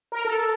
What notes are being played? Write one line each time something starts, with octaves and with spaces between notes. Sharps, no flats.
A#4
A4